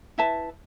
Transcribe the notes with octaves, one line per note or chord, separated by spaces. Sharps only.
E4 B4 E5 A5